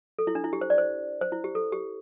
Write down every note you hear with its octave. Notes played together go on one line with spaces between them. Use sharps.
A4
E4
D4
E4
G4
C5
D5
C5
C5
E4
G4
A4
G4